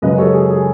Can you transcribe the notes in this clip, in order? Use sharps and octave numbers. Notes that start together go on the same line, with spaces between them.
F#2 C#3 G#3 B4 D#5
A4 C#5
G#4
G#4